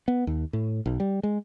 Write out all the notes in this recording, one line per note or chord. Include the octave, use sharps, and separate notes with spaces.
B3
D#2
A2
B1
G3
G#3